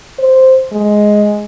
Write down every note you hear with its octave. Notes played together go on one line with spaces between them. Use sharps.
C5
G#3